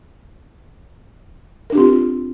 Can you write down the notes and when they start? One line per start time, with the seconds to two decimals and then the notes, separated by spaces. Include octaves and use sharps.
1.70 A#4
1.73 D4
1.75 G4
1.78 C4
1.80 F4